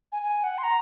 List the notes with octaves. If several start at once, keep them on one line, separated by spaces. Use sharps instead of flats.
G#5
G#5
F#5
C6
A#5